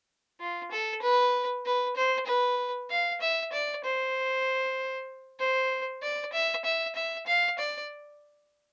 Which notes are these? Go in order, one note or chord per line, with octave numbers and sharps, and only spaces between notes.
F4
A4
B4
B4
C5
B4
F5
E5
D5
C5
C5
D5
E5
E5
E5
F5
D5